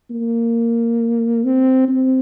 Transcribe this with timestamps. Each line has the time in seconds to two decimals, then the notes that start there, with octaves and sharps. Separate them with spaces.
0.10 A#3
1.44 C4
1.88 C4